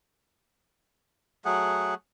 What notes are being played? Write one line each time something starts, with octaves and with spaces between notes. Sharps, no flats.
F#3 A3 G#4 F#5